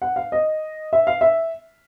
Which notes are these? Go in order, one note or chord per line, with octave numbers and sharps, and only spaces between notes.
F#5
F5
D#5
E5
F5
E5